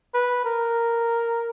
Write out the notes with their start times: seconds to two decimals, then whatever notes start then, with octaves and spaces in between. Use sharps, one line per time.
0.14 B4
0.45 A#4